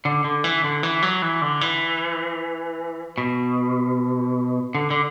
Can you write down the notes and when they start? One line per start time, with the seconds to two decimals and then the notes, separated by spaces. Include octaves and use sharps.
0.05 D3
0.24 D3
0.44 E3
0.64 D3
0.83 E3
1.02 F#3
1.22 E3
1.42 D3
1.61 E3
3.18 B2
4.75 D3
4.91 D3